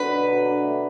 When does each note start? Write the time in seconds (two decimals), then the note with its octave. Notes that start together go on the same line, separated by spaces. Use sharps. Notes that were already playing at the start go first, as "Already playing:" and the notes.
Already playing: D3 F#3 B3 D4 B4
0.10 B2
0.28 F#3
0.45 D4
0.63 A3